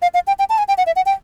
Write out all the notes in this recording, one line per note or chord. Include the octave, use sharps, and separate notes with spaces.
F5
F5
G5
G5
A5
G#5
G5
F#5
E5
F#5
G5